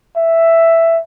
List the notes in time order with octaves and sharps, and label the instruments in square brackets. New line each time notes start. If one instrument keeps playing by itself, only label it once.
[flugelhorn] E5